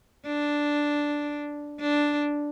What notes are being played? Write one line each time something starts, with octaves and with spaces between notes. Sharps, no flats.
D4
D4